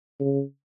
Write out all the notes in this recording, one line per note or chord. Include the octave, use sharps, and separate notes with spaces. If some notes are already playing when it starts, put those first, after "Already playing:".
C#3